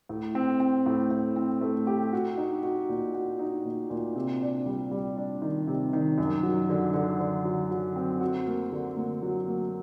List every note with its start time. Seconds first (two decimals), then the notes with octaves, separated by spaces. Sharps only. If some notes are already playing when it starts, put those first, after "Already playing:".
0.09 A2
0.35 C4
0.60 C4
0.86 A2
1.11 A2
1.36 C4
1.61 A3
1.87 G4
2.13 F#4
2.37 D#4
2.63 F#4
2.89 A#2
3.14 F#4
3.39 D#4
3.65 A#2
3.90 A#2
4.15 C3
4.41 D4
4.66 G3
4.91 G3
5.17 D4
5.42 D#3
5.67 C3
5.93 D#3
6.18 F#2
6.43 F#3
6.69 D3
6.94 D3
7.20 D3
7.45 F#3
7.71 F#3
7.96 C4
8.21 F#4
8.47 A#3
8.72 D3
8.97 A#3
9.22 F#3
9.48 A#3